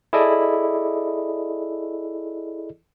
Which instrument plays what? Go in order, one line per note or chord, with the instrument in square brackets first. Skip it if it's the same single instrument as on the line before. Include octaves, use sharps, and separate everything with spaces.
[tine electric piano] E4 G#4 A4 D5 D#5